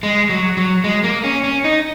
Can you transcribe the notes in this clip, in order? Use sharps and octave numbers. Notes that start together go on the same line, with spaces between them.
G#3
F#3
F#3
G#3
A#3
C#4
C#4
D#4